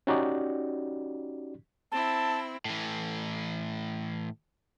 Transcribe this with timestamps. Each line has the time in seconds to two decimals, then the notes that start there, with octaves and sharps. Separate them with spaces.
0.07 C#4 D#4 F#4 G4 D5
1.92 C4 E4 A5
2.65 A2 E3